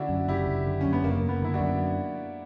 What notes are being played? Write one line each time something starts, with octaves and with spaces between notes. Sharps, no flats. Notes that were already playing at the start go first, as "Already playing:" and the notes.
Already playing: D3 C#4 D4 E4 F#4
F#2
F#1 E4 G4
F#1
D3
F#2 C#4
B3
F#1 A#3
F#1
B3
D3 E4
D4 F#4
F#2